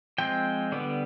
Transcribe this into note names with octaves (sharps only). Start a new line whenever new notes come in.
F3 G#3 C4 G5
D3 G3 B3